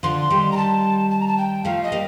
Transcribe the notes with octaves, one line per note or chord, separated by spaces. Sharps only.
D3 F3 C6
D#3 G3
A#5
A5
A5
A#5
A5
G5
F3 A3 F5
D#5
G3 A#3